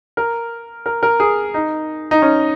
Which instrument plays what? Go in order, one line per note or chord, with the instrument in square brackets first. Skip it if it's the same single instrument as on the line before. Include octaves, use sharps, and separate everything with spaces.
[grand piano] A#4
A#4
A#4
G#4
D#4
D#4
C#4